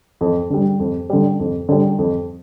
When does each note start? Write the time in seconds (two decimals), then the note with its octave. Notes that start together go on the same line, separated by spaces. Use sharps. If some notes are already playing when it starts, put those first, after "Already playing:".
0.21 F2
0.50 D3 G3
0.80 F2
1.10 D3 G3
1.40 F2
1.69 D3 G3
1.99 F2